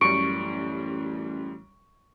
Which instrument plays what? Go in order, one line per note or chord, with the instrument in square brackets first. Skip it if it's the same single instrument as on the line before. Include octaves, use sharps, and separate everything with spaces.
[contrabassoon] A1 [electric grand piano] F#2 G3 [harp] C#6 [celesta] D7